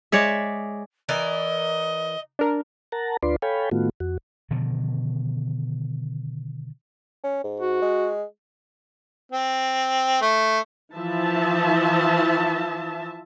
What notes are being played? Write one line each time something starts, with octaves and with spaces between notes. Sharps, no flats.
G#3 C#5 D5 E5
E3 A#4 D5 D#5
D4 A#4
A#4 F#5 A5 A#5
D2 D4 F4 B4 D5 C6
A4 C#5 F5 G5 G#5 B5
A2 D#3 A3 B3 F4 F#4
F2 F#4
B2 D3 D#3 F3
C#4
G#2
F#4
G#3
C4
A3
E3 F3 E5 A5